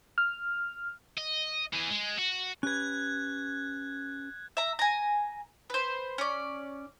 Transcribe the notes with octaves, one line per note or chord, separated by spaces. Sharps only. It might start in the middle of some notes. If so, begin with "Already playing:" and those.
F6
D#5
E3 G#4
G#3
F#4
C#4 G4 B4 F#6 G#6
E5 A#5
G#5 A#5
B4 C5
C#4 D5